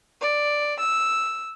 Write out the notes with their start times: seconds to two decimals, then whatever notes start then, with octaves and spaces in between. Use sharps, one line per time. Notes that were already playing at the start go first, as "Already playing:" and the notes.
0.21 D5
0.79 E6